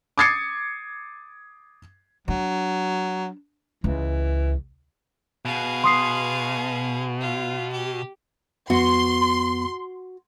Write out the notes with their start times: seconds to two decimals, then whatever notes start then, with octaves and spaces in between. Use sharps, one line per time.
0.18 D6 D#6 G#6 A6 C7 C#7
2.28 F#3 D4
3.84 C#2 E3
5.45 B2 G#4 F5
5.84 C6 D#6 C7
7.21 F4
7.73 G4
8.70 F2 B3 F#4 C6